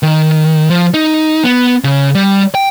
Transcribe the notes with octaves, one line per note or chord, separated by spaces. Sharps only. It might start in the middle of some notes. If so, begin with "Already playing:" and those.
D#3
F3
D#4
B3
C#3
G3
G5